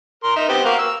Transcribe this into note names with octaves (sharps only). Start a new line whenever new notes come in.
A#4 C6
D#4 E5
B3 C4 G4
A#3 F#4 F5
E6